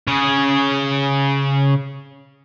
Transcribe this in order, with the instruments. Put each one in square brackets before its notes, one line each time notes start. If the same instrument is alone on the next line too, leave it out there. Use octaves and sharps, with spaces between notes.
[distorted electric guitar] C#3 G#4